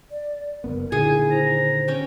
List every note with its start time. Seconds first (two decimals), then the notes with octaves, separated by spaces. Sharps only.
0.11 D5
0.64 F#1 G2 B3 A#4
0.92 A#2 D3 D#3 E4 G#4 G#5
1.31 C5 A#5
1.88 C#4 G5